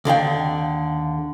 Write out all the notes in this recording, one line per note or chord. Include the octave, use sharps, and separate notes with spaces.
D#2 D3 F5 G5